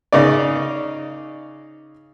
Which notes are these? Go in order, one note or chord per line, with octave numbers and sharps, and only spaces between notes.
C#3 D#4 D5